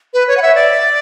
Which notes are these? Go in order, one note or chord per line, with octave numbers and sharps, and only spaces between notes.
B4
C#5
F#5
E5
D5